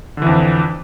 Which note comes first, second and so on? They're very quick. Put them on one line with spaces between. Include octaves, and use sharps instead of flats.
D3 E3 F2